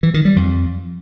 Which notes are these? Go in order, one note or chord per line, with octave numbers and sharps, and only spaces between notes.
E3
D#3
G3
F2